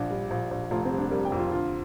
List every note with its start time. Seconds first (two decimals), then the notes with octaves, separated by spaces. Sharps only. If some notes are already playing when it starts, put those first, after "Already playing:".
Already playing: A#1 D4
0.10 G3
0.31 A#1
0.51 A#1
0.71 F1 F4
0.85 C4
0.91 G3
0.98 D4
1.11 G3 A#4
1.25 G5
1.32 F2
1.39 F4
1.52 D3 F4